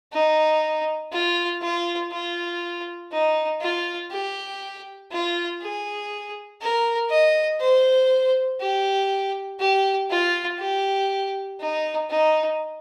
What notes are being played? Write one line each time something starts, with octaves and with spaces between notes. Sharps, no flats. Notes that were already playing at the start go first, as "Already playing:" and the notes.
D#4
F4
F4
F4
D#4
F4
G4
F4
G#4
A#4
D#5
C5
G4
G4
F4
G4
D#4
D#4